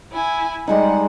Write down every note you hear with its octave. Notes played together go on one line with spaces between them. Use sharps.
E4 G#5
G3 G#3 D#4 F#5